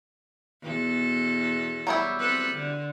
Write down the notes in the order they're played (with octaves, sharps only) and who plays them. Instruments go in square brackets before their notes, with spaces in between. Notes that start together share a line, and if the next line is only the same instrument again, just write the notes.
[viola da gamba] E2 B2 A4
[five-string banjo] F#3 G3 E4
[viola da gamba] C4 A4 B4
D3